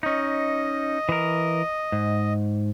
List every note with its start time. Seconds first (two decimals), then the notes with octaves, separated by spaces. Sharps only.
0.03 C#4 D#4 D#5
1.09 E3 A#4
1.92 G#2